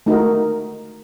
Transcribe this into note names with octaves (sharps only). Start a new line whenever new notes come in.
A3 D#4 F#4 A#4